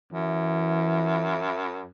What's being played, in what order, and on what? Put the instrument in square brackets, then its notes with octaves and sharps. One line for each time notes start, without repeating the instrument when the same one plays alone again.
[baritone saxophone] F#2 [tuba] E3 [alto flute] E5